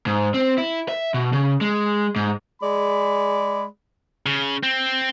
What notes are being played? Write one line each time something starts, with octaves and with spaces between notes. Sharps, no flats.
G#2
C4
E4
E5
B2
C#3
G#3
G#2
G#3 G#4 D5 B5
C#3
C4